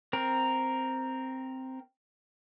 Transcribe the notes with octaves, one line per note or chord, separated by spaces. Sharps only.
C4 A#4